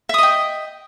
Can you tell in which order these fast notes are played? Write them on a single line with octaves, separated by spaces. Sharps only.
E5 D#6 D#5 G5